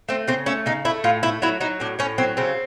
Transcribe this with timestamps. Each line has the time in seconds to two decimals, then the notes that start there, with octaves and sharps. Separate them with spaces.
0.09 A3 C4
0.27 C#3 C4
0.46 A3 C#4
0.66 C#3 D#4
0.85 A3 E4
1.04 A2 F4
1.23 A3 E4
1.42 F#3 E4
1.61 F#3 D#4
1.80 A2 D4
1.99 A2 C#4
2.18 F#3 C4
2.37 C#3 C4